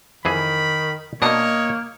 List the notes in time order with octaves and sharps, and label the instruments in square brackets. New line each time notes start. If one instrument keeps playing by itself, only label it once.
[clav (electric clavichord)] F2 E3 G#4 [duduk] D#3 [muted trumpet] B5
[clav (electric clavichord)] B2 D4 A#4 [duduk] A#3 [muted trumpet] C#5 [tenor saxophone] D#5